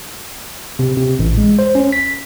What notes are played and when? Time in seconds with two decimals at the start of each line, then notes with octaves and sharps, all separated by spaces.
0.79 C3
0.97 C3
1.19 A1
1.38 G#3
1.59 C5
1.75 C#4
1.92 B6